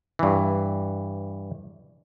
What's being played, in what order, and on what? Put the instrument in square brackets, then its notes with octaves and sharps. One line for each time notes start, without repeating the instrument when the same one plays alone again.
[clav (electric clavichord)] G2 E3